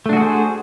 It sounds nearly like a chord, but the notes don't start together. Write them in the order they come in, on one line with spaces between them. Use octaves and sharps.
A3 D4 F#4 G#4 C5